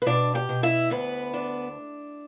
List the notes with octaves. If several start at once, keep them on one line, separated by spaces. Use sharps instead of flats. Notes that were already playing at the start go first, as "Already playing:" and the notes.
B4
B2 D4 D5
G4 G5
B2
E4 E5
D2 B3 B4
D4